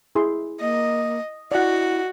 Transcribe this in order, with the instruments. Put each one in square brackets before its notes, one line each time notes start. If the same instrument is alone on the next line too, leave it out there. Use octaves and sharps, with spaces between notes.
[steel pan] E4 G#4 C6
[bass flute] A#3 [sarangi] D#5
[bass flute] E4 [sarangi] F#4 [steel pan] D5 F#5